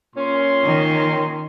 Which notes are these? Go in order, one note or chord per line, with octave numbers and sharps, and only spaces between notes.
A#2 C#4 C6
D#3